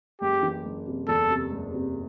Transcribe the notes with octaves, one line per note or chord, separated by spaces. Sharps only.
F#1 G4
E3
F#1
C3
E2 A4
C3
F#1
C3